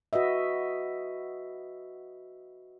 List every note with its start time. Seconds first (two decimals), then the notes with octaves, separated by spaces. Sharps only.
0.13 F#4 B4 D#5 E5